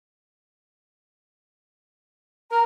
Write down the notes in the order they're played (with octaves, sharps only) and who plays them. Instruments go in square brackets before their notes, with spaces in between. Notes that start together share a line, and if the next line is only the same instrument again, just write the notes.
[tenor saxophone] A#4 [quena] A#5